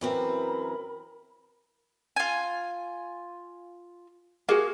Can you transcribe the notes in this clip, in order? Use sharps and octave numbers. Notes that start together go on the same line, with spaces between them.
F#2 E3 C4 A#4 B5
F4 G#5
A#3 F#4 G#4 F5